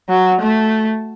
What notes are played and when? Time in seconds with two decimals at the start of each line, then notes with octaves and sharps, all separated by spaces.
0.09 F#3
0.41 A3